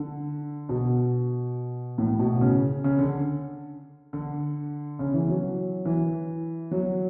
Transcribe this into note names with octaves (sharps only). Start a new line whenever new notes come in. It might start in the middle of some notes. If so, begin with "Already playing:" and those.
Already playing: D3
B2
A2
B2
C#3
C#3
D3
D3
C#3
E3
F#3
E3
F#3